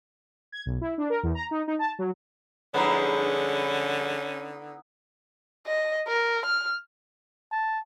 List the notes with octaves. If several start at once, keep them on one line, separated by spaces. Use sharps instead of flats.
G#6
B1
E4
D4
A#4
E2
A#5
D#4
D#4
A5
F#3
G2 D3 F3 G#3 B3 C#4 D#4 E4
D#5
A#4
F6
A5